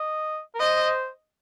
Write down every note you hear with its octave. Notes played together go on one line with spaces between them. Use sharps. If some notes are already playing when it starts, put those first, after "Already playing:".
Already playing: D#5
A#4
C5 D#5